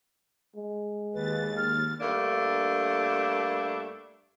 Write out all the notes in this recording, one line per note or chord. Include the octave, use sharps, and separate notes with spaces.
G#3
D#2 B4 A6
F6
G2 A3 A#3 D4